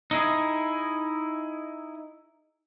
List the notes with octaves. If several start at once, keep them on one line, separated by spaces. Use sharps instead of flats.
D#4 E4 G#4